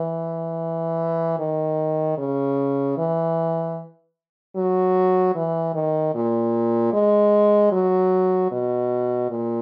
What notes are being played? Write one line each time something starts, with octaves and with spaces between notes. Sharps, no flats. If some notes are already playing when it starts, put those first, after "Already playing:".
Already playing: E3
D#3
C#3
E3
F#3
E3
D#3
A#2
G#3
F#3
B2
A#2